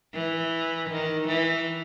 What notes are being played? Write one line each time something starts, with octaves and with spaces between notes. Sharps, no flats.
E3
D#3
E3